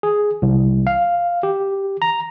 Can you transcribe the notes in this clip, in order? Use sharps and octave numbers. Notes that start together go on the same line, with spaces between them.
G#4
C2
F5
G4
A#5